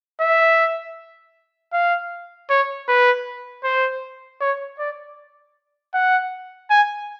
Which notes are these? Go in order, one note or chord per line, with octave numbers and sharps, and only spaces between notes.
E5
F5
C#5
B4
C5
C#5
D5
F#5
G#5